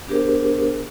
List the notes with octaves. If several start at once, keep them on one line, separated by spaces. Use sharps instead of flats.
B3 D4 G4 G#4 A#4 C5